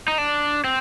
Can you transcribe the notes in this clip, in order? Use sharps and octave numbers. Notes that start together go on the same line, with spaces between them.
D#4
D4
C4